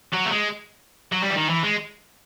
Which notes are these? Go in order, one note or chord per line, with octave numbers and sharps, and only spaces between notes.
F#3
A3
G#3
F#3
G3
E3
D#3
E3
G#3